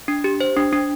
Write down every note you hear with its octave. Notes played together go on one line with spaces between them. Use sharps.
D4
G4
C5
D4
D4